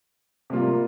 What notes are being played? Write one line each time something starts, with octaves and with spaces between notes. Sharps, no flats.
C3 G3 A#3 F4